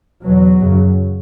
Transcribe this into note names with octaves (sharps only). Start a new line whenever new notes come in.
E2 B2 F#3
F#2 C#3